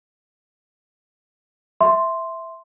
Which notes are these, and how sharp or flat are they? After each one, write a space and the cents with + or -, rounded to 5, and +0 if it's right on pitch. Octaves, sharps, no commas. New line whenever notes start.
E5 -5 C6 +0